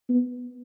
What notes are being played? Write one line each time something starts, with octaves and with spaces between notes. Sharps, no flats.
B3